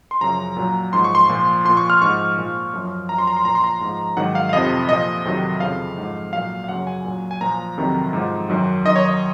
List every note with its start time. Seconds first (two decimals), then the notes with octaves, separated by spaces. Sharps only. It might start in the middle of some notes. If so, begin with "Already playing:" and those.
0.11 C6
0.21 F#2 C#3 F3 A#5
0.56 A#2 F#3
0.93 G#2 F3 C6
1.04 C#6
1.15 C6
1.29 A#2 F3
1.65 F3 C6
1.69 A#2
1.77 C#6
1.90 F6
2.02 G#2 F3 C#6
2.38 A#2 F3
2.73 F#2 F3
3.09 F#2 F3 A#5
3.18 C6
3.27 A#5
3.37 C6
3.45 A#2 F3 A#5
3.55 C6
3.64 A#5
3.81 G#2 F3
4.17 G#2 D#3 F#3 F#5
4.35 F5
4.49 F5
4.53 F2 C3 F3 D#5
4.89 A#2 F3 D#5
5.25 F2 C3 D#3 F#3
5.60 F2 C#3 F3 F5
5.98 G#2 F3
6.33 A#2 F#3 F5
6.64 F5
6.69 F#2 C#3 F#3 F#5
6.87 G#5
7.05 A#2 F#3
7.31 G#5
7.41 A#2 F3 A#5
7.78 F2 C3 D#3 F#3
8.13 G#2 F3
8.49 F#2 D#3 F#3
8.85 F#2 D#3 F#3 D#5
8.96 C#5
9.05 D#5